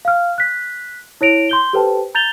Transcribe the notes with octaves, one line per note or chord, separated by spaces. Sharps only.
F5 F6
F#6 B6
E4 C#5 A#6 D7 F7
C6 G6 G7
G4 A4 B4 C5 G5 A5
A#5 G6 A6 F7 G7